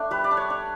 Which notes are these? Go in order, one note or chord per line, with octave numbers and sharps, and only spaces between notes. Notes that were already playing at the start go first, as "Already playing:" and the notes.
Already playing: A3 D4
G3 B4
D5
D4
C#5
D4